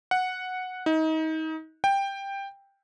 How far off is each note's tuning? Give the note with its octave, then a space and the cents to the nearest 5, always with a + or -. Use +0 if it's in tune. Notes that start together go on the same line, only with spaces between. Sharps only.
F#5 -5
D#4 +30
G5 +10